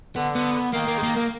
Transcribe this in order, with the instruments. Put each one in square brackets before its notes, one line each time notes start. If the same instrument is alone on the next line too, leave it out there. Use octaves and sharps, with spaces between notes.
[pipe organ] D3 [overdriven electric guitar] B3
[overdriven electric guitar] B3
[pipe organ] D#3 [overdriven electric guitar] A#3
[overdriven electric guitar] A#3
G#3
A#3
A#3